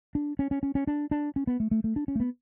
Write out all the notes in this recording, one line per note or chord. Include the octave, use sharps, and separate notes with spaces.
D4
C#4
C#4
C#4
C#4
D4
D4
C#4
B3
A3
A3
A3
D4
C#4
A3
B3